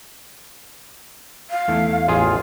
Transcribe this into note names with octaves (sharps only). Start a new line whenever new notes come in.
F5
E2 A3 E4
A1 F4 G#4